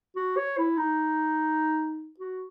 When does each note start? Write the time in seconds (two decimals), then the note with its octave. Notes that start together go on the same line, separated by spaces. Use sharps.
0.16 F#4
0.37 C#5
0.58 E4
0.77 D#4
2.20 F#4